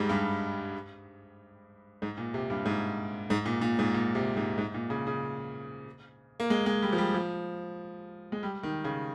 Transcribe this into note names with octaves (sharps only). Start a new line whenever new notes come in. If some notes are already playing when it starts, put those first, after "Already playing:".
Already playing: G#2 G3 G#3
G2
G#2
A#2
C3
G2
G#2
G#2
A#2
A#2
G#2
A#2
C3
G#2
G#2
A#2
C#3
C#3
A#3
G#3
G#3
G3
F3
G3
F3
G#3
G3
D#3
C#3